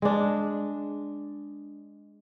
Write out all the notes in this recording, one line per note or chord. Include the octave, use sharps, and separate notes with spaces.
G#3 D4